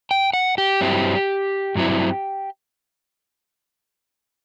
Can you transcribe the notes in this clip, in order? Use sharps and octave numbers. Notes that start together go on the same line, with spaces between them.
G5
F#5
G4
G2 F#3 C4 E4
G2 F#3 C4 E4